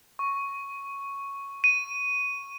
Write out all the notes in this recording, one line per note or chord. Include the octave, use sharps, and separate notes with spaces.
C#6
D#7